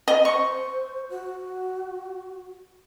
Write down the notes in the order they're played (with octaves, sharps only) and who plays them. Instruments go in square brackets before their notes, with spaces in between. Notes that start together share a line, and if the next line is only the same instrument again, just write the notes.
[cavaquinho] D#5
[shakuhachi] C5 [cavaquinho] C#6
[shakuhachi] F#4